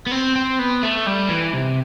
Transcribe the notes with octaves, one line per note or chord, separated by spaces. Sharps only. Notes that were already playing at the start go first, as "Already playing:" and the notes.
B3
C4
C4
B3
A3
G3
E3
C3